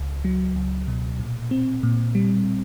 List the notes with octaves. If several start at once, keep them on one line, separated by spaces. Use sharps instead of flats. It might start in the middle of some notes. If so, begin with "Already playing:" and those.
Already playing: C#2
F#3
C#2
B2
A#2
C4
A#2
G3